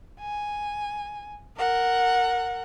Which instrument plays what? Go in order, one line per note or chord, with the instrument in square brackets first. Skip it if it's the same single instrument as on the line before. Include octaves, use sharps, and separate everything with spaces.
[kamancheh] G#5
A#4 F#5